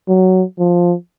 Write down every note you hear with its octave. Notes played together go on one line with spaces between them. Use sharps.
F#3
F3